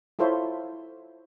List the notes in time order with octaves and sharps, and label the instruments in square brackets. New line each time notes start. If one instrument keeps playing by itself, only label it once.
[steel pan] E4 F4 A4 C5 C#5 E5